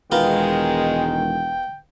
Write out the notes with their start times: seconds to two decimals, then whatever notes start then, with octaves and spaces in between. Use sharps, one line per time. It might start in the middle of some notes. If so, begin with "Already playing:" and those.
0.12 E1 D#3 G#3 B3 F4 A#4 G5